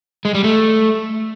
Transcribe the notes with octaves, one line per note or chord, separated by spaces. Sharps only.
G#3
G3
A3